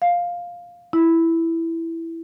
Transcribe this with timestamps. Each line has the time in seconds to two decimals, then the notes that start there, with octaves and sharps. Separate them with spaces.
0.02 F5
0.93 E4